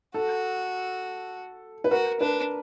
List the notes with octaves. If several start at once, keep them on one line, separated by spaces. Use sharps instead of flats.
F#4 A4
B4
F#4 A#4
D4 B4